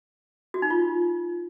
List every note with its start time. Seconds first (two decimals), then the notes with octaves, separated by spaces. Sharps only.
0.54 F#4
0.62 D#4
0.70 F4